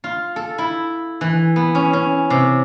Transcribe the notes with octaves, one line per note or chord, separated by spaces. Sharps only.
F4
A4
E4
E3
B3
C#4
C#4
C3